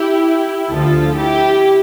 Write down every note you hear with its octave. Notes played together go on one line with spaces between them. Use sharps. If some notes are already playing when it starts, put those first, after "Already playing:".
Already playing: E4 G4
D2 D3 F3 F4 A4
E4 G4